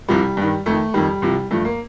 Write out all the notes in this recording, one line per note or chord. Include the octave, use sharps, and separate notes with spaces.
C2 C3 F3 G3
G2 D#3
F2 D#3 A3
F2 D#3 G3
C2 C3 F3
G2 F3 A3
A#3